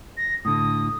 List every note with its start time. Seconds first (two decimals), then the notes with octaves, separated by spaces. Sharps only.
0.17 A#6
0.45 A2 D3 D#6